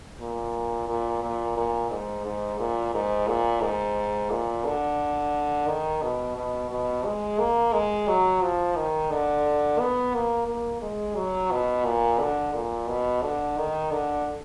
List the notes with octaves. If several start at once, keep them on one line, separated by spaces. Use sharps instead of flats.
A#2
A#2
A#2
A#2
G#2
G#2
A#2
G#2
A#2
G#2
A#2
D3
D#3
B2
B2
B2
G#3
A#3
G#3
F#3
F3
D#3
D3
B3
A#3
A#3
G#3
F#3
B2
A#2
D3
A#2
B2
D3
D#3
D3